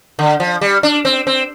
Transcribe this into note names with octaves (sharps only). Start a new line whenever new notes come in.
D3
F3
G3
D4
C4
C4